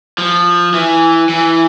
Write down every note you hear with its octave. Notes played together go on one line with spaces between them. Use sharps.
F3
E3
E3